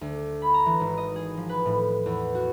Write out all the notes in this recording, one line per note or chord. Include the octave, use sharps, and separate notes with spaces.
D2
B5
A#5
E3
G#1
D#5
G#4
F3
B4
A2
E2
F#4